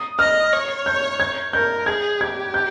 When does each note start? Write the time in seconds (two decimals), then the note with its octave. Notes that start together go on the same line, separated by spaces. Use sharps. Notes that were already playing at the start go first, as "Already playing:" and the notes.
Already playing: D#6
0.19 D#5 F6
0.53 C#5
0.86 G6
1.20 G#6
1.53 A#4 G6
1.86 G#4 G#6
2.20 G4 G#6
2.54 G6